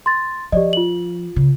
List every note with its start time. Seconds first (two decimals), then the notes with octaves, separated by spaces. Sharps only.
0.06 C6 A6
0.52 F3 G4 D5 D#5
0.73 F4 F#7
1.36 C#3